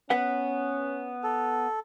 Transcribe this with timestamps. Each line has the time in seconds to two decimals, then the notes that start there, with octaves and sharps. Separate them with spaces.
0.10 B3 C#4 B4 F#5
1.23 A4